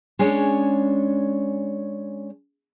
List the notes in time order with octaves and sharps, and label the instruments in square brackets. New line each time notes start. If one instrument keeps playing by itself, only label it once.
[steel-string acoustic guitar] G#3 C#4 D4 C#5